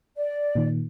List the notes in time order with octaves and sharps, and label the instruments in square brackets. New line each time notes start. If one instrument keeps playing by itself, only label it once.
[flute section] D5
[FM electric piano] A#2 D#3